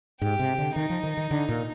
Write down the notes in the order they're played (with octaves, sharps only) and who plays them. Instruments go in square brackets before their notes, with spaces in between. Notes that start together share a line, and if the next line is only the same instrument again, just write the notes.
[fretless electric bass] G#2 [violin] G4
[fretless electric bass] C3
D3
[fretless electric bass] D#3 [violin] D#4
[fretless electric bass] F3
D#3
D#3
D3
A#2